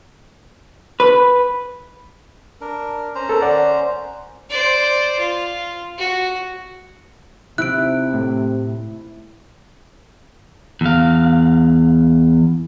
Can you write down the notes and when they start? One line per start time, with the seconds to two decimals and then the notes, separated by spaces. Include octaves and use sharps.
1.00 B4
2.61 D4 A#4
3.15 C#4 C5 A#5
3.29 A4 A#4
3.42 D5 F#5
4.50 C5 D5
5.19 F4
5.98 F#4
7.58 C3 E4 F#6 D7
8.14 A2
10.81 E2 F5